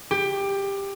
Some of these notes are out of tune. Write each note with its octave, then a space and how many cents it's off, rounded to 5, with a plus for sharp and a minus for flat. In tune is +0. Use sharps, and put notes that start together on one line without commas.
G4 +15